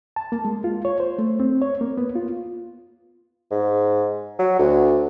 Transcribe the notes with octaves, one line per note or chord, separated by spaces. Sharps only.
A5
A#3
G#3
F4
C#5
C5
A3
C4
C#5
A#3
B3
F4
G#2
F#3
D2